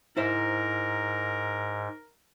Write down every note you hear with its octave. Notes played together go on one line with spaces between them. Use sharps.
G#2 E4 A#4 C5 E5